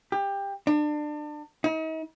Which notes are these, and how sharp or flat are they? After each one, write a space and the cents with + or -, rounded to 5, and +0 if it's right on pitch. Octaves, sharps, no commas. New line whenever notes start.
G4 +20
D4 +30
D#4 +40